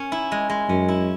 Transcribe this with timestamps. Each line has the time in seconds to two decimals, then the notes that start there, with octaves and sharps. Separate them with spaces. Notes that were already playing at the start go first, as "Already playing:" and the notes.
Already playing: C#4
0.12 E4
0.32 G#3
0.50 G#3
0.69 F#2 C#4
0.88 E4